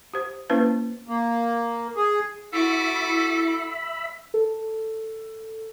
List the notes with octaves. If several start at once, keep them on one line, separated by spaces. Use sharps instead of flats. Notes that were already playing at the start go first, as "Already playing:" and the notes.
G4 C5
A#3 C#4 E4 B4 C5
A#3
G#4
E4 F#4 A4 E5 B5 D6
A4